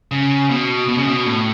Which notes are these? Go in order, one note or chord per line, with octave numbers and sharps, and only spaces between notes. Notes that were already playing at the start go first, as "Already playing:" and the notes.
C#3
B2
B2
C#3
B2
A2